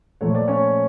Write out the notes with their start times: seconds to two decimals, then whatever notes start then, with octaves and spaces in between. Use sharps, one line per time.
0.21 A#2 F3 A3 C#5
0.35 D5
0.48 C#4 C#5